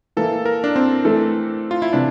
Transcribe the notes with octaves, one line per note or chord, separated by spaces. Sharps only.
E3 A#3 E4 A4
A#4
D4
C4
E3 A3 E4 A4
F4
E4
C3 E3 D4